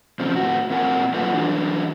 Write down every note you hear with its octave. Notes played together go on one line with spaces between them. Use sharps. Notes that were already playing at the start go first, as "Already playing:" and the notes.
C#3 F3 C4
A2 F#4
A#2 C4 A#4 F#5 G#5
F#3 A3 A#3 F4 B4 F#5
E3 F#3 D4